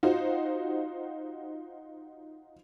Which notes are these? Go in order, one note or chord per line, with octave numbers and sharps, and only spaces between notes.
D#4 F4 F#4 C5